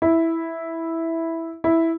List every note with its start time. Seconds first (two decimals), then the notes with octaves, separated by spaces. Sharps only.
0.02 E4
1.64 E4